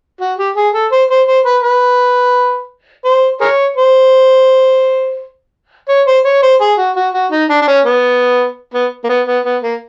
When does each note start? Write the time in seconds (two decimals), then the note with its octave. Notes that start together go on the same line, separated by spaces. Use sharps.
0.21 F#4
0.39 G4
0.56 G#4
0.74 A4
0.92 C5
1.10 C5
1.27 C5
1.45 B4
1.63 B4
3.05 C5
3.41 G#4 A#4 C#5
3.76 C5
5.89 C#5
6.07 C5
6.25 C#5
6.43 C5
6.61 G#4
6.78 F#4
6.96 F#4
7.14 F#4
7.32 D#4
7.50 D4
7.62 D4
7.68 C#4
7.85 B3
8.74 B3
9.04 A#3
9.09 B3
9.27 B3
9.45 B3
9.63 A#3